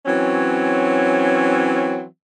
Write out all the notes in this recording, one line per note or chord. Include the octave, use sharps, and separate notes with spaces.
E3 F#3 C4 C#4